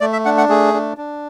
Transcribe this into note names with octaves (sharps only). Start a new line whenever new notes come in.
A3 D5
E5
D4 F#5
F#5
A3 G#4
D4
D4